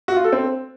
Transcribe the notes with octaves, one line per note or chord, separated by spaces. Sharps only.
F#4
F4
A4
C4